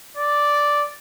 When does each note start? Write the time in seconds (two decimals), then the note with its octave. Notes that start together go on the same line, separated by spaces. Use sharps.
0.17 D5